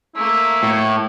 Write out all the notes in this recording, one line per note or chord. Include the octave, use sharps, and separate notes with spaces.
A3 A#3 E4
A2